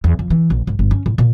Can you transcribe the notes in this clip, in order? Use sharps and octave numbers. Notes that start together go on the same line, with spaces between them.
E2
F2
E3
A#1
G#1
G1
C#4
A2
A#2